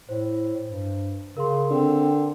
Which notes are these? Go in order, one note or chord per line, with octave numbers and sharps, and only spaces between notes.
A2 C5
G2
C#3 A#4 C6
D3 C4